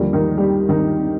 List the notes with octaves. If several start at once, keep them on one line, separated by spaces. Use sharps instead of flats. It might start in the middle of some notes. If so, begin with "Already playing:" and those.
Already playing: D#2 D3 F3 G3 G4
D#3 D#4
G3 G4
D#3 D#4